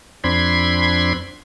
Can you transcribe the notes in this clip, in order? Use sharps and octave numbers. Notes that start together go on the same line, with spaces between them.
F2 C4 D4 B5 C6 G#6